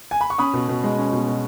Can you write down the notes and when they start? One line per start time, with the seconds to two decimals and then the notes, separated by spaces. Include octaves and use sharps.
0.11 G#5
0.21 B5
0.30 C#6
0.38 C#4 B5 D#6
0.54 B2
0.68 B2
0.83 G#3
0.98 C#4
1.13 B2
1.27 B2